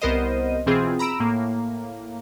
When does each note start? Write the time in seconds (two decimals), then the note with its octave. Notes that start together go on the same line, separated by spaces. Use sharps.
0.01 C2 B3 A#4 C5 D#5 D#7
0.66 B2 E3 C4 F4 G#4
0.99 A#5 B5 E6 D7 E7
1.20 A2 A#3